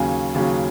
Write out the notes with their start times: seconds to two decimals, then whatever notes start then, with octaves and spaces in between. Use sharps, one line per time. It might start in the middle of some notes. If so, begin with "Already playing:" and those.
Already playing: D#2 C#3 F#3 C#4 G#5
0.34 D#2 C#3 F#3 C#4